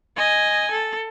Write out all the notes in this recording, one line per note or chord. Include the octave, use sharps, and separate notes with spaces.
D#5 G#5
A4